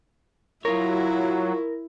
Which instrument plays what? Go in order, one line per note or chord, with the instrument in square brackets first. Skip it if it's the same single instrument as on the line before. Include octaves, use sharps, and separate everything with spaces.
[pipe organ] F#3 [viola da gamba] E4 [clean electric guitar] F4 C#5 [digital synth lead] A#4